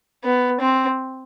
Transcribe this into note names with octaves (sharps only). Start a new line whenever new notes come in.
B3
C4